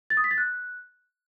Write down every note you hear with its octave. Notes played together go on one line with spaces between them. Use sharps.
A6
D#6
B6
A6
F#6